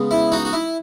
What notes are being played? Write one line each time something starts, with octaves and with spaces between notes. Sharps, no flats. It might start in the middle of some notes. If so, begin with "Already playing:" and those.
Already playing: C#3 G#3 B3
E4
D#4 F#4
F#4
E4